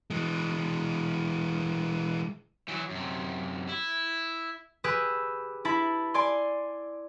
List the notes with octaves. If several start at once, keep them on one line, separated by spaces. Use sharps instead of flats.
E3 G#3
E3 F#3
F#2 C3
E4
G4 G#4 B4 E6
E4 A5 B5
D5 G#5 C6